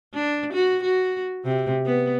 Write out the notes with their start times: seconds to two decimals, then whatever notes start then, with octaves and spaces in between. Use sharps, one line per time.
0.14 D4
0.53 F#4
0.83 F#4
1.44 C3
1.86 B3